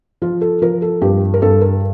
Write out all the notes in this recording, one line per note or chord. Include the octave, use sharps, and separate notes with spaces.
F3 F4
A4
F3 A#4
A4
G2 G4
A#4
G2 A4
A#4